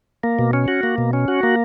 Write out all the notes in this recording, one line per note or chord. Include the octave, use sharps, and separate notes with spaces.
A#3
B2
C#4
F#4
A#3
B2
C#4
F#4
A#3